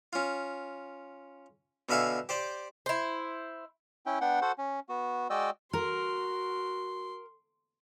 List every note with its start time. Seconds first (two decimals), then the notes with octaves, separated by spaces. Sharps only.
0.13 C#4 F4
1.89 B2 D3 E5 F5 G#5 C#6
2.29 G4 C5 D5
2.86 E4 C5
4.06 C#4 E4 G5
4.21 B3 D4 F#5 G5
4.42 F#4 A4 C5 F#5
4.58 C#4
4.89 B3 F#4
5.30 G#3 F#4 D5 D#5 G5 E6
5.73 F#4 A#4 C6